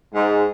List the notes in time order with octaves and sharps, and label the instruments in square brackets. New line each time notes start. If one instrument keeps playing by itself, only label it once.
[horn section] G#2